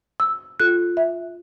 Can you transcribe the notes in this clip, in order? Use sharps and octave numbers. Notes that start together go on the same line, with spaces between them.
E6
F4 A4 F#6
E5